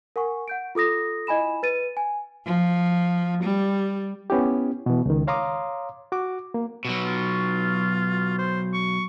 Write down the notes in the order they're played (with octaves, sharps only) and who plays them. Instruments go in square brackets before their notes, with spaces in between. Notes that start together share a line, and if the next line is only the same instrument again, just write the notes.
[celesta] A#4 F#5 G#5 C#6
F#5 G6 D7
F4 A4 D#6 A#6
E4 D#5 G#5 B5 E7
B4 A6 D#7
G#5
[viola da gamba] F3
G3
[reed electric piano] B3 C#4 E4 G4
B2 E3
C#2 D#3
C#5 F5 A#5 C6 D6 D#6
F#4 D6
A#3
[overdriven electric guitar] B2 F#3
[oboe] F4
C5
C#6